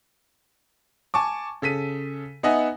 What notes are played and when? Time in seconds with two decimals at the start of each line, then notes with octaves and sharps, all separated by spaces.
1.14 G#5 A5 C#6 D6
1.62 C#3 A4 B6 D#7
2.43 B3 D#4 D#5 E5 F#5 G#5